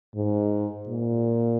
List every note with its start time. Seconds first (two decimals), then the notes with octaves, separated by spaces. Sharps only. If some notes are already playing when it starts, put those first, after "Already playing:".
0.15 G#2
0.88 A#2